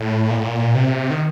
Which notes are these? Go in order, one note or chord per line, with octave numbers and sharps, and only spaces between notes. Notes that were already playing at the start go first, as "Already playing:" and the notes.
Already playing: A2
A#2
A2
A#2
C3
D#3